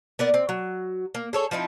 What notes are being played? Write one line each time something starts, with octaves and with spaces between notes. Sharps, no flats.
B3 A#4 D5
C4
F#3
A#3
G#4 A4 C#5
F3 C4 D#4 E4